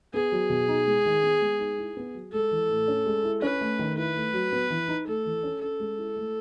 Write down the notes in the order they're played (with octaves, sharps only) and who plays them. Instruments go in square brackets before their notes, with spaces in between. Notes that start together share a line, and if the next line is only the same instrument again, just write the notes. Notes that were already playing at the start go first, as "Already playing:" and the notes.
[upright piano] B3 [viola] G#4
[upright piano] F#3
B2
D#4
G#3
D#3
B3
G#3
D#4
E4
B3
F#3
[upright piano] G#3 [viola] A4
[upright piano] E3
A2
C#4
G#3
E4
[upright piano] C#4 [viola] B4
[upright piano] A3
D#3
[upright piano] E4 [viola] B4
[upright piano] A3
F#3
B3
E3
D#4
[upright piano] A3 [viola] A4
[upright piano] E3
C#4
[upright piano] C#4 [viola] A4
[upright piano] G#3
E4
A3